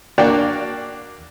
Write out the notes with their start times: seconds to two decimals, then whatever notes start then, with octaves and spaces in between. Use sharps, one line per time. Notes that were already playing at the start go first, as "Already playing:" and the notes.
0.18 A#3 D4 F#4 D5 F5 G5